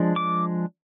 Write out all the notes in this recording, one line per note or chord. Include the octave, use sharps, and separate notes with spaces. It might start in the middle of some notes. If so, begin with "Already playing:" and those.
Already playing: F3 G#3 D4
D6